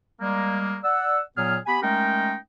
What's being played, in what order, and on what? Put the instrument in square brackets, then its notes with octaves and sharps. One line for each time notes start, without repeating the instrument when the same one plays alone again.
[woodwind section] G3 G#3 A#3
D5 F#5 E6
A#2 F#3 B3 G#4 F6
B3 G4 G#5 B5
G#3 A3 C#4 D#4 A#4 G5